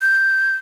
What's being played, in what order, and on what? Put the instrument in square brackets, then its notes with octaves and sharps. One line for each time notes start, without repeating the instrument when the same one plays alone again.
[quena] G6